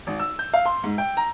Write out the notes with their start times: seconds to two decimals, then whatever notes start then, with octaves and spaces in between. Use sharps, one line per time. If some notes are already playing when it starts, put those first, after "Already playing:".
0.07 G#1
0.20 E6
0.39 G6
0.54 F5
0.66 C6
0.84 G#2
0.98 G5
1.17 A#5